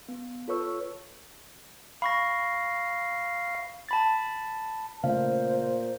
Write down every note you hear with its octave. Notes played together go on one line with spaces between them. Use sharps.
B3
F4 A4 B4 C#5 C#6 E6
F5 B5 C#6 A#6
A5 B5 A6
A#2 C#3 A3 C5 F5